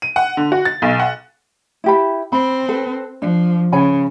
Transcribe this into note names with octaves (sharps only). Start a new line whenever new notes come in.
D#7
F#5
D3
F#4
A6
B1
F#5
E4 G4 B5
C4 B5
A4 B4
F3 D4
C#3 C#5 G#5 B5